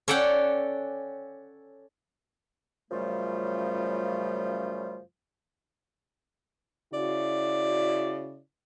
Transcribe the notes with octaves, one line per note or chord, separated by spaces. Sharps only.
C#4 A4 D5 F#5 G5
F#2 C#3 F3 G3 A3 F4
C#3 E4 F#4 D5